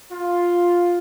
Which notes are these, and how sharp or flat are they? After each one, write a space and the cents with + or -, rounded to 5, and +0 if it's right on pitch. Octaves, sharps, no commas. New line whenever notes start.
F4 +5